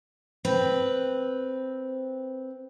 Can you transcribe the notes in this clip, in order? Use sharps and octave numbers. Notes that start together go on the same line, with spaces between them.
C4 B4